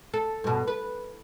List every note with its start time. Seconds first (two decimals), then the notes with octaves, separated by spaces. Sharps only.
0.14 A4
0.44 G2 B2
0.67 B4